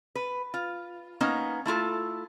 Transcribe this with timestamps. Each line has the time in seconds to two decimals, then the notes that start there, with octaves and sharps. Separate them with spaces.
0.15 B4
0.54 F4
1.20 A#3 B3 C#4 D#4
1.65 A3 E4 F4 A4